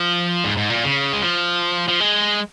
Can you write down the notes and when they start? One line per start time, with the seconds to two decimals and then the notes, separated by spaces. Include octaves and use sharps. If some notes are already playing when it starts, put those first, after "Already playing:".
Already playing: F3
0.44 G#2
0.57 G#2
0.70 A#2
0.83 C#3
1.13 G#3
1.22 F3
1.88 F3
2.00 G#3